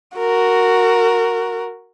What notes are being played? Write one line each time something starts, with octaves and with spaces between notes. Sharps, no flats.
F#4 A#4